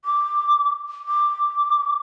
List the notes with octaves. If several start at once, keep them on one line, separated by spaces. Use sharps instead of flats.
D6
D6